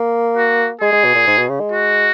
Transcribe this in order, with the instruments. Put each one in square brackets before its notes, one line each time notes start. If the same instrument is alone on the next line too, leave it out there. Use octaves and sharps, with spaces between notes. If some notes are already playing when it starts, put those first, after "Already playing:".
Already playing: [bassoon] A#3
[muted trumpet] F#4
[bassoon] G#3 [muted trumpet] G#4
[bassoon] G#3
B2
A#2
G#2
B2
C#3
G#3
[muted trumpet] F#4